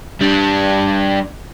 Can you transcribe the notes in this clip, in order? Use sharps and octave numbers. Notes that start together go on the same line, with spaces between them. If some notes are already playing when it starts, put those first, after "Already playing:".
G3 D4